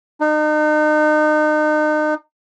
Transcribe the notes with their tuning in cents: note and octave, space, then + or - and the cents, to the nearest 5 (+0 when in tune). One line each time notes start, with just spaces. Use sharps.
D#4 -35